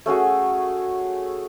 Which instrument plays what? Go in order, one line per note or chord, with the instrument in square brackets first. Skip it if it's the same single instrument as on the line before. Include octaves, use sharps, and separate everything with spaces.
[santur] A3 C#4 F#4 G#4